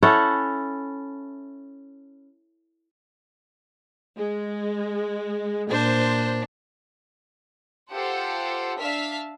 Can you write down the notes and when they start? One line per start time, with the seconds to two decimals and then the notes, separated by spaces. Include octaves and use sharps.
0.03 C#4 E4 A4 F#5
4.17 G#3
5.71 A#2 D4 C5
7.91 F4 G4 A4 C5 F#5
8.79 D4 E5 F5 A5 F6 B6